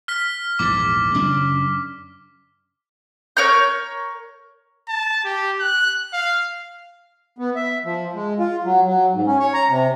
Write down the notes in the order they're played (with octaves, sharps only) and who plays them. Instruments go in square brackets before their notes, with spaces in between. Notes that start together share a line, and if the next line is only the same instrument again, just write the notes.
[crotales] F6 B6
[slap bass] A#1 E2 G#2 [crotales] D6
[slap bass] F#2 C#3 D4
[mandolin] A#4 C#5 F6 G6
[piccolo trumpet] A5
G4
F#6
F5
[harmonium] B3
E5
F3
G#3
F4
F#3
F#3
G#2
C#4
C#5
A#5
C3